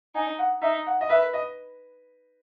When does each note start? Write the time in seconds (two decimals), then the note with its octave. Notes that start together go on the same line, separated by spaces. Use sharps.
0.15 D#4 G#5
0.39 F#5
0.62 D#4 E5
0.87 F#5
1.01 D#5
1.10 B4 E5
1.33 D#5